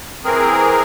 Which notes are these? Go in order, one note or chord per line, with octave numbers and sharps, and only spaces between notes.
E3 C4 G#4 A#4